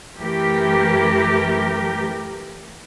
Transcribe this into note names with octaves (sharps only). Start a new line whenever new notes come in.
F#2 E3 A3 G4 A#4